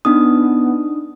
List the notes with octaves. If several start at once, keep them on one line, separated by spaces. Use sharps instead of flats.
B3 D4 D#4 D#6